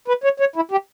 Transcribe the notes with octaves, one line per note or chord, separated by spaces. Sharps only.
B4
C#5
C#5
E4
G4